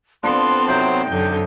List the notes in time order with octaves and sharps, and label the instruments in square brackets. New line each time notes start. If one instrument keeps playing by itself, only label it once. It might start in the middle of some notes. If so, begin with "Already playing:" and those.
[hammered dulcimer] F3 D4 [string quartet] B3 C4 A4 [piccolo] C6
[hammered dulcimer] C3 D#4 [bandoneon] F#3 C5 [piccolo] G5
[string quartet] F#2 D3 [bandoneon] G6